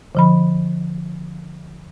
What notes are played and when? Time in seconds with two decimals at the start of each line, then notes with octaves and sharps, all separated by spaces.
0.15 D3 F3 B5